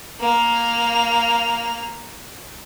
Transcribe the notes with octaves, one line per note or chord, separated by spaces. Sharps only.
A#3 F7